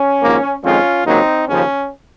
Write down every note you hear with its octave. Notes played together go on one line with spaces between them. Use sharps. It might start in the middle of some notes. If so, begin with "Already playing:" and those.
Already playing: C#4
G#1 G#2 F3 A#3
F2 D#3 G#3 C4 C#4 F4
D#2 C#3 F#3 A#3 C4 D#4
D#2 C#3 F3 C#4